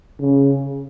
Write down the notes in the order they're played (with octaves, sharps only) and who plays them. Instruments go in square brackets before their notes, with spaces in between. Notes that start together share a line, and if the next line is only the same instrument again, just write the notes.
[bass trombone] C#3